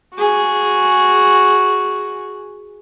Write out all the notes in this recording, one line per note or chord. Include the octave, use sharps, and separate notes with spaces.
F#4 G#4